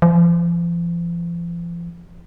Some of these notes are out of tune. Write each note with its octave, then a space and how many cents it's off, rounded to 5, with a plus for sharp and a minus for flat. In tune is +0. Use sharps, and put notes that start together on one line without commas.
F3 -40